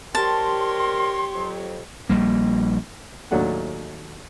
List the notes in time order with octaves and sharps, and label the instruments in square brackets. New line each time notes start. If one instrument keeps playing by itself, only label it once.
[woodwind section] G3 C4 A#4 [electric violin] G4 C#5 [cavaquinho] A5 [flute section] C6
[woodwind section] F2 F#3
[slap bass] A#1 G3 A#3
[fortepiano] D#2 A2 F#3 A3 D4 F#5